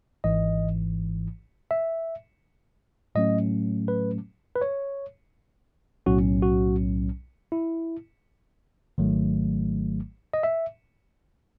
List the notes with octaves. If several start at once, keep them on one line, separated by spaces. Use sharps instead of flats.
G#1 G#2 E3 D#5
E5
A2 F#3 A3 C#4 D#5
B4
B4
C#5
B1 A2 F#3 C#4 F#4
F#4
E4
G#1 G#2 D#3 F#3 A3
D#5
E5